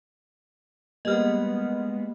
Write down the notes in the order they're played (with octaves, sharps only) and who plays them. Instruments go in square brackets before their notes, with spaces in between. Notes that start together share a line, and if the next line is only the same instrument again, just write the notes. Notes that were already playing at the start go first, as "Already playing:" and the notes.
[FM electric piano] G3 A#3 [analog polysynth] G#3 B3 [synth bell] D#5 F6